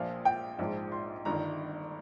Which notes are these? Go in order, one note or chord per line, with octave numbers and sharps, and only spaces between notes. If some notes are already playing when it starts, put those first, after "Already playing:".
Already playing: A#1 A#2 F3 F5
G5
A#1 G#2 F3
C6
G1 G2 D#3 A#5